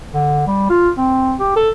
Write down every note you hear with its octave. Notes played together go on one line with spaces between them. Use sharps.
D3
G3
F4
C4
G4
A4